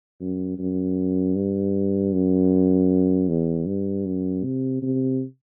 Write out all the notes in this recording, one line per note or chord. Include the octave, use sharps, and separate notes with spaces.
F#2
F#2
G2
F#2
E2
G2
F#2
C3
C3